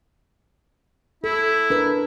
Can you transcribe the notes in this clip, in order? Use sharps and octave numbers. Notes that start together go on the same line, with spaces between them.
E4 A4
D4 A#4 B4